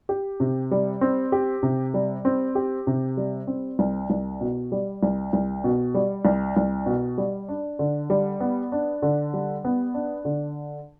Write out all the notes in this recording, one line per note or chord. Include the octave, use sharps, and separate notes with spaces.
G4
C3
G3
C4
G4
C3
G3
C4
G4
C3
G3
C4
C2
C2
B2
G3
C2
C2
B2
G3
C2
C2
B2
G3
D4
D3
G3
B3
D4
D3
G3
B3
D4
D3